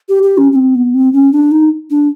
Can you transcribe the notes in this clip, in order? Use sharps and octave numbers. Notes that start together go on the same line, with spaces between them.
G4
G4
C#4
C#4
C4
B3
C4
C#4
D4
D#4
D4